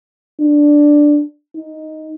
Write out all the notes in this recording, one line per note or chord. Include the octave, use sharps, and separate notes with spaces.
D4
D#4